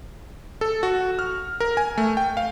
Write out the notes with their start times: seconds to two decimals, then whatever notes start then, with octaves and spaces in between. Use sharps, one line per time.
0.61 A4
0.83 F#4
1.19 F6
1.60 A#4
1.77 G#5
1.98 A3
2.17 G5
2.37 F5